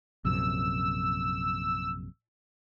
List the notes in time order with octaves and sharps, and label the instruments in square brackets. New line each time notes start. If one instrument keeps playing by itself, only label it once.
[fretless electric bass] A#1 F#2 C3 [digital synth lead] E6